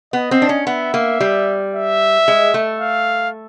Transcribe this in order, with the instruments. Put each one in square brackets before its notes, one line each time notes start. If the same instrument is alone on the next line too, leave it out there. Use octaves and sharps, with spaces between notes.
[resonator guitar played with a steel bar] B3 [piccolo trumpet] D#5
[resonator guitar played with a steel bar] C4
D4
C#4
[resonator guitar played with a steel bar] B3 [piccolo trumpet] E5
[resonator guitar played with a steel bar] A#3
G3
[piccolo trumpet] E5
[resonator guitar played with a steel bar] G#3
A3
[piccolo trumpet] F5